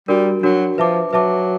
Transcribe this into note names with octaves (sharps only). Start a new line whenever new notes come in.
G3 D4 F#4 A#4
F#3 D4 F#4 A#4
F3 B4 E5 A5 D6
F#3 B4 E5 A5 D6